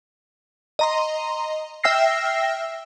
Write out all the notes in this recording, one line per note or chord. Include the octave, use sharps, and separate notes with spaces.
D#5 A#5 C6
E5 G5 E6 F6 A#6 C7